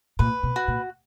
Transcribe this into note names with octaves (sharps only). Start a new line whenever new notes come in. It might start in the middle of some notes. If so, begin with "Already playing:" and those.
A#2 B4
B2
F#4
A#2